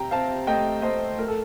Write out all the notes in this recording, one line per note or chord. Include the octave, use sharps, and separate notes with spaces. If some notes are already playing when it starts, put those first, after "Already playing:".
Already playing: C3 G5 A#5
C4 F5 A5
A3 D#5 G5
A3 C5 D#5
A3 A#4
A4